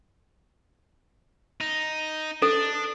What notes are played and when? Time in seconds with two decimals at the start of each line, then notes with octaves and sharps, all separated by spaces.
1.61 D#4
2.42 D4 A4